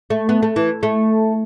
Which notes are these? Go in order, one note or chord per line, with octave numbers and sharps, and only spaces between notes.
A3
B3
A3
E3
A3